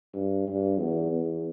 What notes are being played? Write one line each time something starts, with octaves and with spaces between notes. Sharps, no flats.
G2
G2
E2
E2